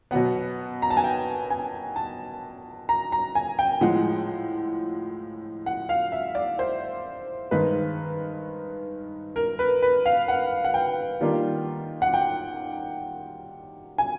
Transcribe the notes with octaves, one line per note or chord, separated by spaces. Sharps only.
B2 F#3 B3 F#5
A#5
A5
G#5
G5
G#5
A5
A#5
A#5
G#5
G5
A2 F3 G#3 F#5
F#5
F5
E5
D5
C5
G2 D#3 G#3 B4
A#4
B4
B4
F5
F#5
F#5
G5
D#3 G3 A#3 D4 F4
F#5
G5
G#5